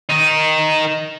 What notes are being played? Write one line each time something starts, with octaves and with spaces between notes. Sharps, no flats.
D#3 D#4